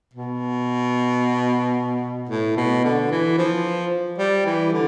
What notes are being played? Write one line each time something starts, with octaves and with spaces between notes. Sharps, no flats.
B2
A2
B2
D3
E3
F3
G3
E3
D3